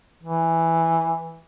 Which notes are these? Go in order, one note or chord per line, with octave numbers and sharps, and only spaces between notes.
E3